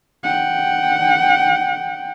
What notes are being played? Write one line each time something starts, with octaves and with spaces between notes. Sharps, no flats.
F#5 G5